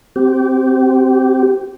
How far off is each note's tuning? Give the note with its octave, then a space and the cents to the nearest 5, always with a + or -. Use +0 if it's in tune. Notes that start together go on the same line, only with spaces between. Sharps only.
C4 +0 G4 -25